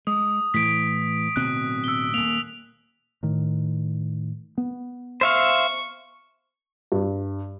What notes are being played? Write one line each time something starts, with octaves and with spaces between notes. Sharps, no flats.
G#3 D#6
A2 E3 B6 D7
D1 B2 C4 F#6
E6 G7
D#1 A#3 F7
A2 D#3
B3
C5 E5 F5 C#6
G2